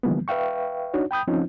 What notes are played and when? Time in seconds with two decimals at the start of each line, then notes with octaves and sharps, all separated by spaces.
0.03 D3 E3 F3 G3 A#3 B3
0.28 B4 E5 F5 G5 C#6
0.94 D4 D#4 F#4 C#5
1.11 G5 B5 D#6 G6
1.28 F3 C4 C#4 D#4 F4